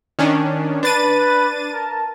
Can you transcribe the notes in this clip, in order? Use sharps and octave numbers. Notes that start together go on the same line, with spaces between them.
D#3 C#4 D4
D4 B4 A6 D#7
A#4 A5